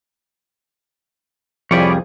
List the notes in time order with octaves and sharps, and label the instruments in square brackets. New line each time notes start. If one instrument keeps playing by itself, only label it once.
[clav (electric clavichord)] C2 F2 G3 [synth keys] F3 G#4 [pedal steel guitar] C#5 D5 B5